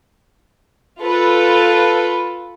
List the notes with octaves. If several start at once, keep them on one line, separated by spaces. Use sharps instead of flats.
F4 A4 B4